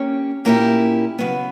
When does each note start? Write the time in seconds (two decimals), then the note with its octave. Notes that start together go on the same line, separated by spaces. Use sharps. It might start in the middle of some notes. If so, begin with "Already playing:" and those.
Already playing: A#3 C#4 G4 C#5
0.45 A#2 A#3 C#4 E4 G4
1.19 C#3 F#3 B3